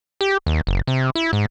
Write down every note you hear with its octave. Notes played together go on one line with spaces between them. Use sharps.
G4
D#2
F#1
C3
E4
G#2